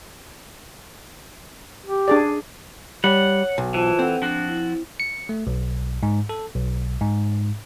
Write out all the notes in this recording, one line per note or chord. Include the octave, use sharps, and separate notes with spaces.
G4
D4 G#4 D5
G3 C#5 F#5
B1
E3 F4 C5 A5
C4 A4 F#5
F3 D4 F#4
E4
C#7
A3
B1
G#2
A4
B1
G#2